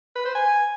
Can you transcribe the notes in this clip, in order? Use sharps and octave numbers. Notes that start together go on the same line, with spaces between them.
B4
C5
G#5